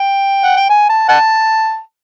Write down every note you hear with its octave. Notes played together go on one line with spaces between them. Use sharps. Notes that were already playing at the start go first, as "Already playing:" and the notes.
Already playing: G5
F#5
G5
G#5
A5
F#5 A5